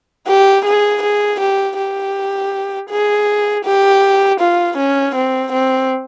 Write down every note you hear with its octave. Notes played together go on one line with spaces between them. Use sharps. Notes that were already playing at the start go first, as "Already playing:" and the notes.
G4
G#4
G#4
G4
G4
G#4
G4
F4
C#4
C4
C4